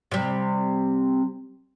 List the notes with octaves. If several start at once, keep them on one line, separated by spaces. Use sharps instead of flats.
C3 G3